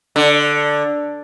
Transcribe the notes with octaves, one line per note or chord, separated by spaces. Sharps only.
D3